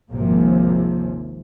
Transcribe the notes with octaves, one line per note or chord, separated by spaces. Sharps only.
G#1 D#2 G#2 C3 F3 A#3